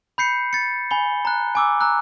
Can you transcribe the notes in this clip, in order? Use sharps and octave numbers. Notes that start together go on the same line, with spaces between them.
B5 G6 C7 C#7
A6 C#7
G#5 B5 G7
A#5 F#6
G#5 D6 E6
A#5 E6 F#6